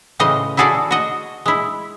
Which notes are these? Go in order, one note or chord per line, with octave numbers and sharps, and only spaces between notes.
A2 C#3 E3 C5 D#5
E4 F#4 G#4 A4 D5
F#4 D#5
G#3 E4